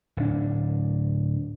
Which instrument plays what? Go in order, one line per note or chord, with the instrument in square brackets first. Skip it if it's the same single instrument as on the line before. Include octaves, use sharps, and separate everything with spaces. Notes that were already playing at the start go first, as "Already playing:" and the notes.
[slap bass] D1 D4